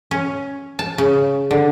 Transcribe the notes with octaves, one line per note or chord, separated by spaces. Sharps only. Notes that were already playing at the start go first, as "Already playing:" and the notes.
C#4
A5
C#3
D3